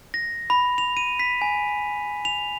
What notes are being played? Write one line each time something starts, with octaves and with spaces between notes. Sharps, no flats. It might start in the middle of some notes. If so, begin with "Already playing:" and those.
A#6
B5
F7
D#7
B6
G#5
F7